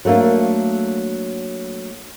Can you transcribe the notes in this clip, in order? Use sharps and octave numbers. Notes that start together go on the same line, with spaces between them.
F#3 A3 A#3 D4